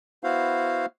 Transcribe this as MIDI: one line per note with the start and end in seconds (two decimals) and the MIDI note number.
0.24 0.86 59
0.24 0.86 64
0.24 0.86 66
0.24 0.86 72
0.24 0.86 77